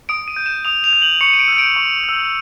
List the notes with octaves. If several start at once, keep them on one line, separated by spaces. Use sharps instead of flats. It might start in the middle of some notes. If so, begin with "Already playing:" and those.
D#6 D7
D#7
G6
E7
D#6 F7
F7
G6
F#7
C#6 C#7
D#7
D7
E6 G6
D7
C#6
G6
E6